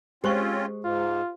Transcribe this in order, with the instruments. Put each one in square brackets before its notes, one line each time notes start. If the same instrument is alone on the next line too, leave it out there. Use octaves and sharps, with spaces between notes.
[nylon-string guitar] G#3 [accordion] C4 C#4 F4 [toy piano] G4 C5 C#6
[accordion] G#2 [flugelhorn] F4